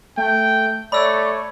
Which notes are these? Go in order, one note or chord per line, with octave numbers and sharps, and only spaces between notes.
A3 G5
A3 C#5 D5 B5 E6